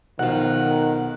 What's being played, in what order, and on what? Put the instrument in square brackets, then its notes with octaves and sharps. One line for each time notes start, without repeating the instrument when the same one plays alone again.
[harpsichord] B1 F3 [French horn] D#3 [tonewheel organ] F#5